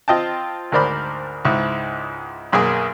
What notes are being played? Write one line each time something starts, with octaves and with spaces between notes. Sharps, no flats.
C4 F4 D#5 G5 A5
D2 G#2 A#4 C5 D5 B5
C#2 G#2 E4
B1 F#2 A#3 G#4 G#5